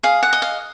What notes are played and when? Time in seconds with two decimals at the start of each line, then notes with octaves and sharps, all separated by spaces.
0.03 G#4 F5
0.23 F#5
0.33 D#5
0.42 F5